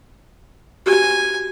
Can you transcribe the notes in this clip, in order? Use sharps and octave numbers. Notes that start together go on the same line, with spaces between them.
F#4 G4 G#5